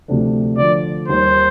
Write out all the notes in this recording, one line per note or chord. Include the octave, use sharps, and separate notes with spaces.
D2 C3 F3 A3 D4
D3 F3 A3 D5
D#2 D#3 G3 A#3 D#4 C5